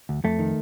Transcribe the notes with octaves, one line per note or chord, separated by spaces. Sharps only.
D2
F2 A3
D#3